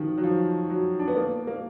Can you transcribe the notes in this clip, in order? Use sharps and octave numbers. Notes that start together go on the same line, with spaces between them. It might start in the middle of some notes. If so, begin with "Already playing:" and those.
Already playing: D#3 F3
F#3
F3
F#3
D4
B3
A#3
A#3